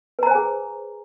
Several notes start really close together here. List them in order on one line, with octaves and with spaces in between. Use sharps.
B4 A#5 C5 G#5 G#4